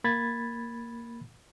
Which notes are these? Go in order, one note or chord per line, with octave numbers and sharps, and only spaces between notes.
A#3 B5 G#6 A6